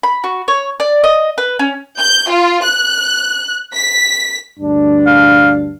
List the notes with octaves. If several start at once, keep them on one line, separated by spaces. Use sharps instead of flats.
B5
F#4
C#5
D5
D#5
B4
C#4
G6
F4
F#6
B6
D2 G2 D4
F5